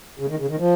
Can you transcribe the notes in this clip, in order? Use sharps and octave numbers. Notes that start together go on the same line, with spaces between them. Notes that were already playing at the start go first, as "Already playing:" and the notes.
C#3
D#3
C#3
D#3
F3